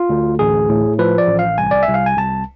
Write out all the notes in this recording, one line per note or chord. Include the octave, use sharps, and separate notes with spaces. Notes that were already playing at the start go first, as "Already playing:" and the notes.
Already playing: F4
D2
A1 G#4
A2
F3 B4
D5
A1
F5
C2 G#5
D5
E5
C2
F5
G#5
C2 A5